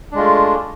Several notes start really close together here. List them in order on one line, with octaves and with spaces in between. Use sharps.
D4 G#3 F4 A3